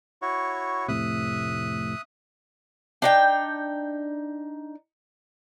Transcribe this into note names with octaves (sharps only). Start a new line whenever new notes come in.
E4 F#4 C#5
F1 A2 C3 E5 D#6 F#6
D4 D#4 G5